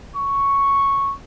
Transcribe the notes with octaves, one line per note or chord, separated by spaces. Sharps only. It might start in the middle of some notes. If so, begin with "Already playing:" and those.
C#6